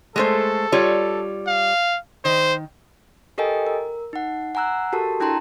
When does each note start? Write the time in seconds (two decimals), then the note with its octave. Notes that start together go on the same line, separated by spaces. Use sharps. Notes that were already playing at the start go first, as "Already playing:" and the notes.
0.16 G#3 A3 A4 C5
0.72 G3 F4 C#5
1.47 F5
2.25 D#3 C5
3.38 G4 A4 A#4 D#5 G5 G#5
3.67 A#4
4.13 D#4 F#5
4.55 F#5 G#5 A#5 E6 F#6
4.93 F#4 G4 A4 A#4 A5
5.20 D4 E4 G5 A5 A#5 C6